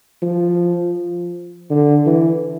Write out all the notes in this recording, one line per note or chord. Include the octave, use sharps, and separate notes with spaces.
F3
D3
E3